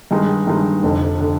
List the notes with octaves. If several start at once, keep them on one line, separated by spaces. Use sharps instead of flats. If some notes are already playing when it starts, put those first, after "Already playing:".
G2 D#3 G#3 D#4
G2 D#3 G#3 D#4
F1 F2 D3
D3